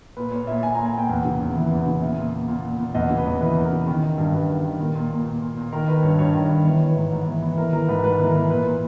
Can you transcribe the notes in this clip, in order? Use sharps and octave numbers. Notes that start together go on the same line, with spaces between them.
A#2 B4
A#2 C#5
A#2 E5
A#2 G#5
A#5
A#2
G#5
A#2 G5
E2
C#3
E2
E3
E2
C#3
A#2 E5
A#2
A#2
A#2
A#2
A#2
E2 D#5
C#3
B4
E2
E3 B4
E2
A#4
C#3
D#3
D#3
G2
G2 B4
D#3
D#3
A#2 A#4
A#2
A#2
A#2
A#2
A#2
D#3 A#4
D#3 B4
G2 C#5
G2 C#5
D#3
D#3
E3 C#5
E3
B4
G#2
G#2
E3
E3
E3 A#4
E3 A#4
G#2 B4
G#2 B4
E3
A#4
E3
A#2 B4
A#2